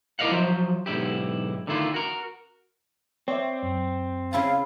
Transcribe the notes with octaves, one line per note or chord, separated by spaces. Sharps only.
E4 A#4 D5 D#5 F5 F#5
F3 F#3 C5 E5
B1 G#2 D3 E4 G4
D3 D#3 A3 E4 F4
F#4 A#4
C4 C#5 D5 E5
F#2
C#3 E4 F5 A5